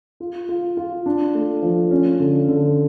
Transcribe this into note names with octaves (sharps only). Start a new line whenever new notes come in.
F4
F4
F4
D4
A3
F3
C#4
D3
D3